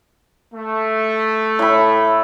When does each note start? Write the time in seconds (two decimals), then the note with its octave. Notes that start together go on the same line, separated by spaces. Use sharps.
0.54 A3
1.59 A2 B5